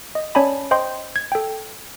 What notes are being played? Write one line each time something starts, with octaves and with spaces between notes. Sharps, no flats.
D#5
C#4 C#5 D5 G#5 A5 B5
C5 D#5 G5 C6
G#6
A4 G5